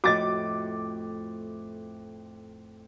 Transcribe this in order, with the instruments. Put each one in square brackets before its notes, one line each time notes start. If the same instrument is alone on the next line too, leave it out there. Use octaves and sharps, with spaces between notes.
[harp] F2 A2 [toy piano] F#4 D#5 [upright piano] D6 A6